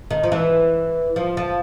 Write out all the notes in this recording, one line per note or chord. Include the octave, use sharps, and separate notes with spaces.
D#3
F3
E3
F3
F3